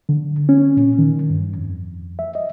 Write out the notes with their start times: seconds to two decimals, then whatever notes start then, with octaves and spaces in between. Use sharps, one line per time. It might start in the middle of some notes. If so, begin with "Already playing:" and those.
0.09 D3
0.49 C#4
0.77 A#2
0.99 D#3
1.30 G2
1.58 F2
2.19 E5
2.35 D#5